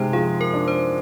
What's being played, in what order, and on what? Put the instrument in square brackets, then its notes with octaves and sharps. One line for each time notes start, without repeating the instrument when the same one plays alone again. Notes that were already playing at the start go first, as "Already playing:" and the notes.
Already playing: [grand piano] C3 G#3 [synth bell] D#4 C5
[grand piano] F3 [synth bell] G#4
[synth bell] A#4
[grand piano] D4
[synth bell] C5